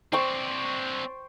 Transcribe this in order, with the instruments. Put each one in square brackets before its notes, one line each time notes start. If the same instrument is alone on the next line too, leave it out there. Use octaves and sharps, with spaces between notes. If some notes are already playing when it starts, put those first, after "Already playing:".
[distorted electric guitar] C4 D4 [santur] C5 G5 C#6